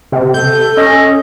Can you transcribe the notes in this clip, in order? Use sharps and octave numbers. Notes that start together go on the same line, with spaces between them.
C3
A4 G6
C#4 D#5